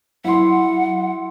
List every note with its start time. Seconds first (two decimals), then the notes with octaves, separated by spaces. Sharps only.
0.25 F#3 E4 F#5 C6